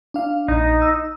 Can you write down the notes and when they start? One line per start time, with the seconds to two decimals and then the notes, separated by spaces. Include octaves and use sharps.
0.14 D4 F5
0.48 A#1 D#4
0.82 E6